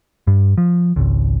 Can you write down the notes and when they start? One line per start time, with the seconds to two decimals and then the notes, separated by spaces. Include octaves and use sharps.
0.27 G2
0.58 F3
0.96 G#1 C#2